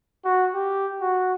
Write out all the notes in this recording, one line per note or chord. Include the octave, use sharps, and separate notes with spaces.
F#4
G4
F#4